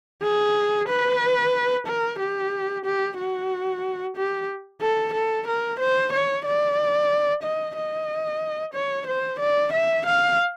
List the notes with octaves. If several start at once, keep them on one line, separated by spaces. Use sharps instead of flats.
G#4
B4
A#4
G4
G4
F#4
G4
A4
A4
A#4
C5
C#5
D5
D#5
D#5
C#5
C5
D5
E5
F5